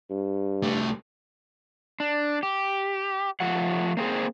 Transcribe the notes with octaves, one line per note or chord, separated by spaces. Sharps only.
G2
C2 A3
D4
G4
F3 A3 F#5
A#3 C4 G#4 C5